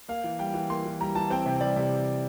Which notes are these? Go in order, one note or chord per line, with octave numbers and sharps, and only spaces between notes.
A#3 F5
E3
G3 G5
E3
A#3 C6
E3
G3 A#5
E3 A5
C4 G5
C3
G3 D5
C3